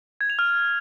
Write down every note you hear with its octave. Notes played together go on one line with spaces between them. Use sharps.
G#6
F7
F6